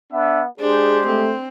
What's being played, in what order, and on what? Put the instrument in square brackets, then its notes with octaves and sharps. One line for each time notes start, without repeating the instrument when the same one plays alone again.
[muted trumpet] B3 [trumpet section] D4 E5
[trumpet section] G#3 G4 [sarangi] D4 [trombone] G#4 [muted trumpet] C5
[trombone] A3 [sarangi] C4